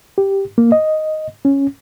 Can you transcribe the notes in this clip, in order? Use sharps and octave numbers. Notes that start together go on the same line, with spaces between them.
G4
A#3
D#5
C#4